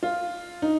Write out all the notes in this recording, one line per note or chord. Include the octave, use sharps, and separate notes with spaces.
F4
D#4